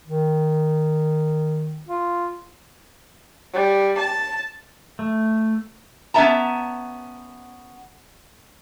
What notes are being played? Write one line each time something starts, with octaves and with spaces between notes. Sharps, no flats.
D#3
F4
G3
A5
A3
B3 C#4 G#4 E5 A5 A#5